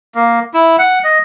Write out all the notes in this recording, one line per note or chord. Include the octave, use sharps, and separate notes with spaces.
A#3
E4
F#5
D#5